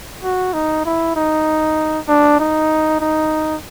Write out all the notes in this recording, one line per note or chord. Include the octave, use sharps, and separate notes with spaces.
F#4
D#4
E4
D#4
D4
D#4
D#4